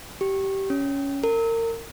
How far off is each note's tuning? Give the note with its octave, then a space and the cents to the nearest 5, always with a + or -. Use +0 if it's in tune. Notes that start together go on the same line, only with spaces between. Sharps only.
G4 -15
C#4 +10
A#4 -30